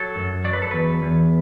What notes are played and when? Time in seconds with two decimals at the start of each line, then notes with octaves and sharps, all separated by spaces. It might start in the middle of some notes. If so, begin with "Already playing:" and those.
Already playing: F#3 A4
0.16 F#2
0.44 F#3 D5
0.53 B4
0.62 A4
0.71 E2 B4
1.02 E2